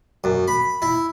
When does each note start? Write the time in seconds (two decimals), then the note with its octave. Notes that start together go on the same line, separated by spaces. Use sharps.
0.24 F#2
0.48 B5
0.82 E4